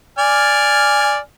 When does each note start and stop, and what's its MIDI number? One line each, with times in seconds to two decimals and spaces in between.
0.18 1.18 74
0.18 1.18 80
0.18 1.18 89